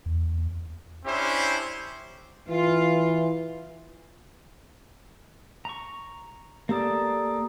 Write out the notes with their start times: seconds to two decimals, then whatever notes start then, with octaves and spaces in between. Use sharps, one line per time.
0.06 E2
1.05 C#4 D4 E4 G4 C5
2.49 E3 F4
5.65 A#5 C#6
6.69 A#3 G4 A4 D5 A#5 D#6